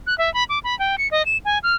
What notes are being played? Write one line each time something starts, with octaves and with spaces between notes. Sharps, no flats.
F#6
E5
B5
D6
B5
G5
C#7
D#5
E7
G#5
F6